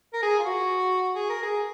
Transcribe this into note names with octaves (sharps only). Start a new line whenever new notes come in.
A#4
G#4
F4
F#4
G#4
A#4
G#4